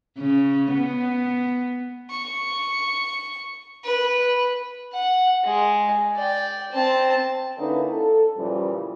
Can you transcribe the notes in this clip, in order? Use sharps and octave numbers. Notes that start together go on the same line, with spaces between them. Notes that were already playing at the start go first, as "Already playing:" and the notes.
C#3
B3
C#6
B4
F#5
G#3
D5 G5
C4 A5
D3 A#3 C#4 D#4 E4 B4
A4
A#2 C#3 E3 F3 G3